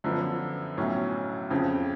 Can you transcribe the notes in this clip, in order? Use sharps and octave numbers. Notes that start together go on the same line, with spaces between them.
F#2 D3 F3 B3
B1 A2 F#3 C#4
F2 C#3 F3